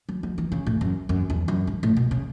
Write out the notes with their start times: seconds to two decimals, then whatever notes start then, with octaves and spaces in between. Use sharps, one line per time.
0.09 F#3
0.23 F#3
0.38 E3
0.52 C#3
0.67 A2
0.81 F#2
1.09 F#2
1.30 E2
1.48 F#2
1.67 G#2
1.83 A2
1.97 B2
2.11 C#3